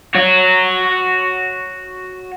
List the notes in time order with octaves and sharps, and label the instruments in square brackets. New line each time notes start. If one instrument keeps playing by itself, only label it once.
[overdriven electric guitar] F#4 C#5